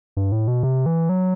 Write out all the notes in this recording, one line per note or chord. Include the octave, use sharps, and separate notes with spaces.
G2
A2
B2
C3
E3
F#3